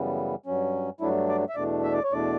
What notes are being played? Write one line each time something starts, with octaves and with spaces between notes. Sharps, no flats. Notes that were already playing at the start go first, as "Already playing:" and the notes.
Already playing: F#2 C#3 E3 G3 B3
G2 F#3 C#4
G2 F#3 A3 D4 E4
D5
E5
E2 B2 A3 D4 D5
E5
D5
C#5
E2 B2 A3 D4 D5